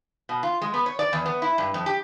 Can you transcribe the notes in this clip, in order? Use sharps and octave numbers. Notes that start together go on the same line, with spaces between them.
B2
F4
G#3
B3
C#5
D5
E2
B3
E4
G2
F2
G4